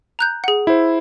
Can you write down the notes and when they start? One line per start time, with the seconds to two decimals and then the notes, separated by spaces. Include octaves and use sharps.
0.19 A#5 F#6 G6
0.44 G#4 F#5
0.67 E4 C5